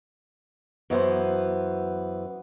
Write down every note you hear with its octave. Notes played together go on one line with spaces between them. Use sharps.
F#2 E3 B3 C5